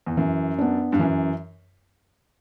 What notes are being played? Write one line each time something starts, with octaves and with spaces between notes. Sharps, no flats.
E2
F#2 E3
B3 D4
G2
F#2 E3